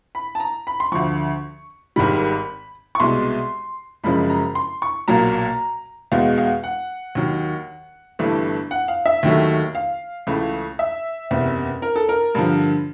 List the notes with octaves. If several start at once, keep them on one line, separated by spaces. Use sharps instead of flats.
B5
A5
A#5
B5
C6
D2 D3 F3 C#6
G#1 G#2 D#3 G3 B5
C#6
C2 B2 G#3 C6
F#1 F#2 C#3 F3 G#3 B5
A#5
C6
C#6
B1 A#2 F#3 A#3 A#5
E2 B2 G#3 F5
F5
F#5
D#2 D#3 F#3
G1 G2 E3 A3
F#5
F5
E5
D#2 D#3 F#3 A3
F5
C#2 C#3 E3 A3
E5
F#1 E2 C3
A#4
A4
A#4
G2 D3 F3